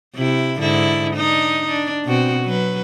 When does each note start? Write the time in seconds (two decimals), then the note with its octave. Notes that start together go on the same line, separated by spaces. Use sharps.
0.15 C3 E4
0.59 G#2 D3 E4
1.16 D4 D#4
1.69 D4
2.05 B2 C4 F#4
2.43 F#3 B4